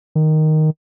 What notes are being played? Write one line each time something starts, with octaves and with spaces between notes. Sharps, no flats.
D#3